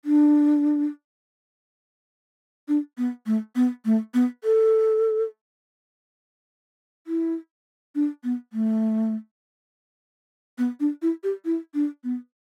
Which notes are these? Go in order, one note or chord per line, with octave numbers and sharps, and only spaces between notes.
D4
D4
B3
A3
B3
A3
B3
A4
E4
D4
B3
A3
B3
D4
E4
G4
E4
D4
B3